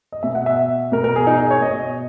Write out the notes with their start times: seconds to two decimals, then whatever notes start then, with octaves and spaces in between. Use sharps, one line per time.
0.12 D#5
0.23 B2 E5
0.35 F#5
0.46 E5
0.92 B2 A#4
1.04 A#4
1.16 G#4
1.27 D#4
1.38 G#4
1.51 C#5
1.61 B2 D#5
1.79 D#5